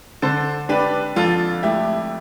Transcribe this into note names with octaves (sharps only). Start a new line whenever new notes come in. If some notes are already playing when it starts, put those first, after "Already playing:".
D3 A4 C5
D4 G4 B4
F2 F4 A4
A3 E4 G4